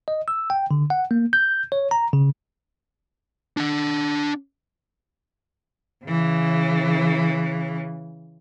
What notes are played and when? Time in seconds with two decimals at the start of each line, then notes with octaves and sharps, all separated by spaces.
0.08 D#5
0.28 E6
0.50 G5
0.71 D3
0.90 F#5
1.11 A#3
1.33 G6
1.72 C#5
1.91 A#5
2.13 C#3
3.57 D4 F#5
6.05 C#3 E3